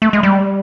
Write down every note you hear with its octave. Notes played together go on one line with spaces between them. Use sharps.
A3
G#3
G3